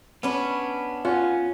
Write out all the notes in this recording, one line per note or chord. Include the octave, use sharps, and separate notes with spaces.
B3 C#4 D4 B4
C#4 F4 F#5